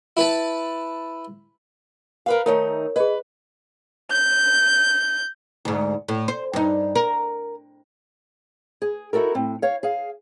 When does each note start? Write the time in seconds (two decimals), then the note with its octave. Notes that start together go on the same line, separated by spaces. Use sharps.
0.17 E4 B4 A5
2.26 A#4 B4 F5
2.46 D#3 A3 D#4 A#4 C#5
2.96 G#4 B4 D#5
4.10 G6
5.65 D2 G#2
6.08 A2
6.28 C5
6.53 G2 D#4
6.96 A#4
8.82 G#4
9.13 D#4 E4 F#4 A4 A#4
9.35 A2 C4
9.62 C#5 F5
9.83 G#4 F5